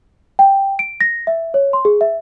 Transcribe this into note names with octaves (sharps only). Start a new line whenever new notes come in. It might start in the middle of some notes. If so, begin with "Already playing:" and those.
G5
D7
A#6
E5
C#5
C6
G#4
E5